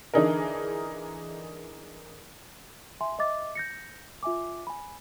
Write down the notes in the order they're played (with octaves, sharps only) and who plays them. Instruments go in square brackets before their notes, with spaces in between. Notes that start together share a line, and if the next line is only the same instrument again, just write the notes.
[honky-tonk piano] D3 E3 D4 D#4 G#4 A#4
[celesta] E5 G#5 C6
D#5 E5 D6 A6
G6 A#6 C#7
F4 E5 G#5 D6
G#5 B5